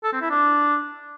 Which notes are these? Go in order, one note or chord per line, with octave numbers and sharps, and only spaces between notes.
A4
C4
E4
D4